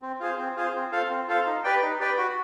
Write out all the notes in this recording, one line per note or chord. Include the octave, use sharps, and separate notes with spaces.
C4
F4 G#4 C5
C4
F4 G#4 C5
C4
F4 A4 C5 F5
C4
F4 A4 C5 F5
D#4
G4 B4 D5 G5
D#4
G4 B4 D5 G5
F#4